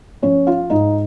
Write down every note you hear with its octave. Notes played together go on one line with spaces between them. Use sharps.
F3 C#4 C#5
F4 F5
G#2 D#4 D#5